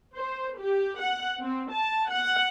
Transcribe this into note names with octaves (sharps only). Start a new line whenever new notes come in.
C5
G4
F#5
C4
A5
F#5